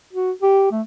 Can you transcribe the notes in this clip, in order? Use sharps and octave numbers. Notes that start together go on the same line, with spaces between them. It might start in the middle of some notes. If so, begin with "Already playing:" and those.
F#4
G4
A3